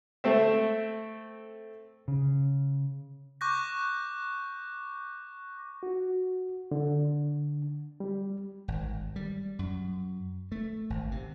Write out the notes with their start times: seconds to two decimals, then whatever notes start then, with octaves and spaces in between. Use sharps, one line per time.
0.24 A3 C4 E5
2.08 C#3
3.41 C#6 D6 F#6 G6 A#6
5.83 F#4
6.71 D3
8.00 G3
8.68 G#1
9.16 G3
9.59 F#2
10.52 A3
10.90 G#1
11.11 C3